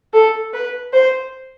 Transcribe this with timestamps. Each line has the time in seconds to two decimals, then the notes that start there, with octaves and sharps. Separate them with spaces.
0.14 A4
0.53 B4
0.93 C5